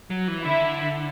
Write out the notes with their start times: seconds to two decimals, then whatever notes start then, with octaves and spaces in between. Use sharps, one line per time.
0.10 F#3
0.28 E3
0.44 D3 E4 E5